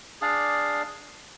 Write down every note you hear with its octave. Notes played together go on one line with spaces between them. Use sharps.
D4 G#4 D5 F5